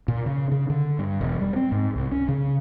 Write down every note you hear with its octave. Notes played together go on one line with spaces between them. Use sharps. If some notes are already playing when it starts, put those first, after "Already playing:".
A#2
C#3
C#3
D3
G2
E1
G3
C4
G#2
C2
C#4
C#3